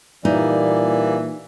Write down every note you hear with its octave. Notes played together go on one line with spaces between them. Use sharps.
A#2 E3 G3 A#3 D#4 D5